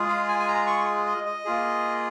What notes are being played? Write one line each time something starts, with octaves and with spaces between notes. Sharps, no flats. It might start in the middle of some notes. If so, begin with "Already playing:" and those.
Already playing: G#3 F4 G#4
F5
G#5
G#5
A#5
C#6
D#5
D#5
A#3 F4 G#4